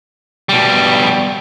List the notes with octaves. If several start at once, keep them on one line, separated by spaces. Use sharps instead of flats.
B2 G3